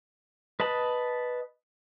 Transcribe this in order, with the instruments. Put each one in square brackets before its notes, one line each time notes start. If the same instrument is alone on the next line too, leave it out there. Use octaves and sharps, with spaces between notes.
[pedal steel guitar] B4 D#5 A5 B5